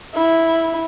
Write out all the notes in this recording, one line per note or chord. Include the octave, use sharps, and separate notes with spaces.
E4